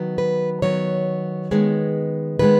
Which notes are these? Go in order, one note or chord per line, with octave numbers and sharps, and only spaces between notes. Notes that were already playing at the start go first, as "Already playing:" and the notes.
Already playing: D#3 F#3 B3
B4
D#3 F#3 B3 C#5
D#3 G#3 B3
D#3 G#3 B3 B4